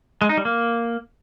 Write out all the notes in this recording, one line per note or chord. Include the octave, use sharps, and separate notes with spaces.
G#3
D#4
G3
A#3